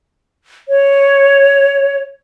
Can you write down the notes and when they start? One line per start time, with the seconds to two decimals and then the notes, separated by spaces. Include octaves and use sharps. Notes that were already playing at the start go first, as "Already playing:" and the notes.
0.69 C#5